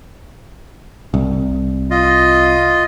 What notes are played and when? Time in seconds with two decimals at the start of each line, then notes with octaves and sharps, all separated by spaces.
1.14 C2
1.90 F4 D#5